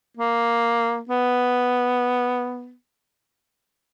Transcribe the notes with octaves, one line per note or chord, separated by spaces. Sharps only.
A#3
B3